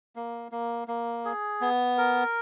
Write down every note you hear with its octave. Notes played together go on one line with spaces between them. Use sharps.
A#3
A#3
A#3
G#4
B3
A#4